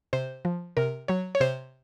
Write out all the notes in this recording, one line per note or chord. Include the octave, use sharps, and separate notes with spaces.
C3 C5
F3
C3 A#4
F#3 C#5
C#5
C3 C5